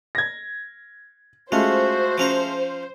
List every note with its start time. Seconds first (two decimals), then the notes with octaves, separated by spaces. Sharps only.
0.15 G#6 A#6
1.52 G#3 A3 C#4 F4 F#4 C5
2.18 F3 C#4 A#5